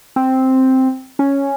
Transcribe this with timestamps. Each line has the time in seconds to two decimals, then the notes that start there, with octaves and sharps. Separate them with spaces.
0.16 C4
1.19 C#4